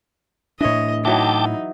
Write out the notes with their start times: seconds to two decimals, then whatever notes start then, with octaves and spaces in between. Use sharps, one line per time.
0.61 A2 E3 D4 C#5 D#5
1.05 E3 F#3 D#4 E4 G5 A5 D6